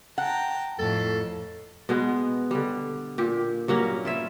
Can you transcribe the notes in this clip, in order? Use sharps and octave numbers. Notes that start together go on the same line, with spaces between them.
F#5 G5 A5 A#5
F2 A2 A4
B2 G#3 B3
D3 G3
A#2 G4
G2 F#3 A#3 C#4
E4 F4 E5